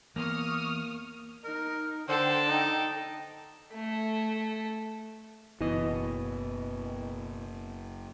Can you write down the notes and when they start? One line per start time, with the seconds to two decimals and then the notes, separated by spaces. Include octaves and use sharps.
0.16 E3 A#3 B3 C#6 D#6 F6
1.44 D#4 A#4
2.09 D3 A4 C5 G5 A5
2.47 D#4
3.74 A3
5.61 F#1 B2 E3 D#5